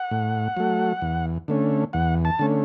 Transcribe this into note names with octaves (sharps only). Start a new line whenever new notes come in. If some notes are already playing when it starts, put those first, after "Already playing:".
Already playing: F#5
A2
F#3 A3
E2
D3 A3 C#4
E2 F#5
A5
D3 A3 C#4